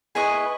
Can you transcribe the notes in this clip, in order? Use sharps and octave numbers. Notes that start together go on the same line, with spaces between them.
E4 G#4 B4 D#5 C#6